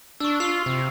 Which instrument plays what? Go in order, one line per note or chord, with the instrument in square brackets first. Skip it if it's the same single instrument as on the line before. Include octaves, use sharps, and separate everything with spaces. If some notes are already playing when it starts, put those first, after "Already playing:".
[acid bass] D4 [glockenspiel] C#6 E6
[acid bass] F4 [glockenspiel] C7 F7
[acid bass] C3